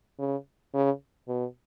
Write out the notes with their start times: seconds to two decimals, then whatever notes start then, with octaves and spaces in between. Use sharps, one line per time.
0.19 C#3
0.74 C#3
1.28 B2